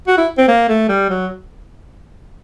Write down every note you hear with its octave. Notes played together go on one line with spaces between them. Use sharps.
F#4
E4
C4
A#3
A3
G3
F#3